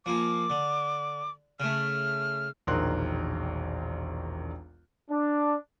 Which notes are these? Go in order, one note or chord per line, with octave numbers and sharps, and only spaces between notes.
F3 A#3 G#5 D6
D3
C#3 A3 F6
E1 A#1 D#3 A#4 C6 F#6
D4